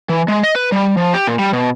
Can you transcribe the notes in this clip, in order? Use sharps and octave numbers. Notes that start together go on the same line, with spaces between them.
E3
G#3
D#5
B4
G3
F3
G4
A#2
G3
B2